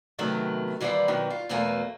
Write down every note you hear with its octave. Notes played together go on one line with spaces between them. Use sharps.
C3 D#3 F#3 A3 B3
D#2 E3 G3 E4 C5 D5
B2 D#3 E3 F#3
F4
E2 B2 F#3 A3 A#3 G#5